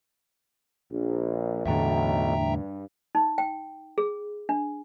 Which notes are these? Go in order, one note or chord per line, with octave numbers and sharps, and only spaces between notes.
A#1
B1 E2 A2 D3 E5 G5 A#5
G2
D#4
G5
G#4
D4